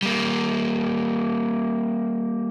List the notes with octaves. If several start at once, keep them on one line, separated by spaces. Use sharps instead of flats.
G3 A#3